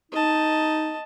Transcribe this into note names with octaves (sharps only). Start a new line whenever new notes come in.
D#4 D#5 A5